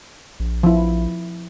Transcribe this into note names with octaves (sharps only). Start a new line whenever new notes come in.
A#1
F3 E4